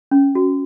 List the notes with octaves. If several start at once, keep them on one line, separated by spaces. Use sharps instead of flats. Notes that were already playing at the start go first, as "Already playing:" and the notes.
C#4
F#4